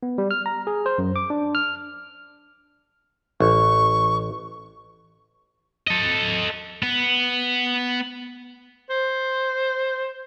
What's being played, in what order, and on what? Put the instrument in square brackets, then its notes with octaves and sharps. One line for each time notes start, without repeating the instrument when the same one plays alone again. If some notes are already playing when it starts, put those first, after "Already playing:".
[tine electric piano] B3
G3
F6
A#5
G#4
C5
F#2
D6
D4
F6
[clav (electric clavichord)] A1 [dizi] C#6
[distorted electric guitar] A4 D#5
B3
[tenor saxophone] C5